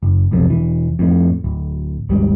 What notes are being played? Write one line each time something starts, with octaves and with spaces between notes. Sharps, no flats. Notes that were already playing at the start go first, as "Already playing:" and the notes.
F#1
F1 B1 F2
E1 E3
F2 A2
D1
G#1 D#2 G#2 G3